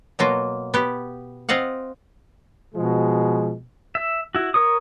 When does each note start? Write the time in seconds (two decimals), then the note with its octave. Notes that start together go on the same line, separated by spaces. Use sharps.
0.19 B2 F#3 A#3 F4
0.74 B3 G4
1.49 C4 F4 D#5 F5 F#5
2.75 B2 F3 G#3
3.95 E5
4.35 E4 F#4
4.54 A#4 C#5 D#6